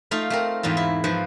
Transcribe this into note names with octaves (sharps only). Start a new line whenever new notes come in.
A3 D#4 F4 F5
A3 C4 A#4
E2 G#2 D#4 F4
E4
G#2 F3 B4 C5